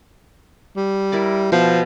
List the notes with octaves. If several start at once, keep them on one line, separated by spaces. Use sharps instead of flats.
G3
E4 A#4 D5
B2 F3 C5